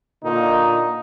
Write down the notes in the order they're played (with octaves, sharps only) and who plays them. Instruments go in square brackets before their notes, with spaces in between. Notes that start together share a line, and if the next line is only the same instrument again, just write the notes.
[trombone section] A#2 D3 D#4